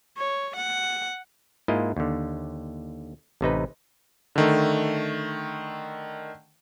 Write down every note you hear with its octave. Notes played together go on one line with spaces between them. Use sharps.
C#5
F#5
G#2 A#3 E4 F4 D#5
D#2 D3
A1 C3 D#4 B4
D3 D#3 A3